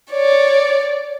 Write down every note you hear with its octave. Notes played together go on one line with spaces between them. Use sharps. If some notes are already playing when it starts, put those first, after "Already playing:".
C#5 D5